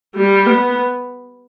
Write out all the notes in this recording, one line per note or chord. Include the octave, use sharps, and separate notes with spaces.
G3
B3